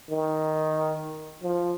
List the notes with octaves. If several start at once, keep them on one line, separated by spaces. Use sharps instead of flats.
D#3
F3